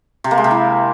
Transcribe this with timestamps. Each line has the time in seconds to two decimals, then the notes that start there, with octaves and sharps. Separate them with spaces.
0.24 C3
0.31 A#3
0.38 G#3
0.44 C3
0.51 E4